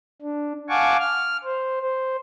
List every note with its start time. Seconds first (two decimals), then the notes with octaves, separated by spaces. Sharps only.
0.22 D4
0.69 F5 F#5 G#5 A5 C#6 D6
0.99 F6
1.43 C5
1.81 C5